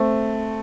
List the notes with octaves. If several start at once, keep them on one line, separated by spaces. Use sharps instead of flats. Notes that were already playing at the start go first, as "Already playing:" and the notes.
Already playing: A3 C4